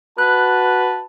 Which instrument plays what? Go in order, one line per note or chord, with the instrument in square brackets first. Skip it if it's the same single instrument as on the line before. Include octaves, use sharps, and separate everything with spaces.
[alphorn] F#4 [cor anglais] B4 [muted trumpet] A5 [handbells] F#6